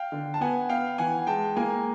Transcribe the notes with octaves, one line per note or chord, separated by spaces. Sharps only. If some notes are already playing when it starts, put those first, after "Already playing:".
Already playing: F5 G5
D3
A5
B3 F#5 G#5
B3 F5 G5
E3 F#5 G#5
G#3 G5 A5
A#3 G#5 A#5